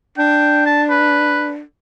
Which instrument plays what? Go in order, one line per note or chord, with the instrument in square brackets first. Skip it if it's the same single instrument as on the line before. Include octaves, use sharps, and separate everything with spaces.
[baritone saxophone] D4 [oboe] G5
[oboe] A5
B4